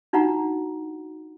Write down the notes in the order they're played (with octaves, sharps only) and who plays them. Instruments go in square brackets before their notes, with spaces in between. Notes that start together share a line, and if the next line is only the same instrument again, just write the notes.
[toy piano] D4 D#4 F4 F#4 F#5 A#5